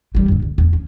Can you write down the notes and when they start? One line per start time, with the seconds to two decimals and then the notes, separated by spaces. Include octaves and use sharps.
0.15 E3 G3
0.28 F#2 D3
0.42 C#2
0.58 E2
0.73 C#4